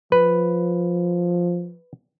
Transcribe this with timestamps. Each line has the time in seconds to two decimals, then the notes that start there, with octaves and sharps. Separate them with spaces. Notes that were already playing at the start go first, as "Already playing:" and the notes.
0.12 F3 B4